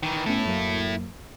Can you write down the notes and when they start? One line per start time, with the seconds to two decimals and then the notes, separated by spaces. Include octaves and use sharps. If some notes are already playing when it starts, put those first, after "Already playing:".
0.03 D#3 E3
0.26 A3 B3 C#4 E4 A4
0.45 F#2 F#3 A#3